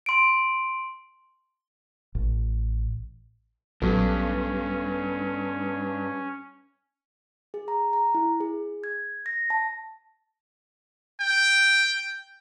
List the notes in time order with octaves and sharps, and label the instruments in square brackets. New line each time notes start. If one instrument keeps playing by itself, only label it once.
[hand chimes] C6 D7
[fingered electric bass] A1
[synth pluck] A#1 F#3 [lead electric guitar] G2 [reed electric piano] B3 A4 [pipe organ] C#4
[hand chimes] G#4
A#5
A#5
E4
G#4
G#6
A#6
A5
[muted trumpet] G5